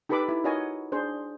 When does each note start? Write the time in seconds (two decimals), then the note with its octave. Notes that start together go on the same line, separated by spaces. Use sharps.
0.09 D#4 G4 A4 B4 B5 D6
0.29 E4
0.44 D#4 F#4 A#4 C#5 D#5 G#5
0.92 D4 G#4 C5